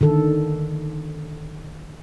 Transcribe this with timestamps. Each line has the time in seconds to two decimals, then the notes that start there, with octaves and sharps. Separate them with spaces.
0.01 D3 D#3 A4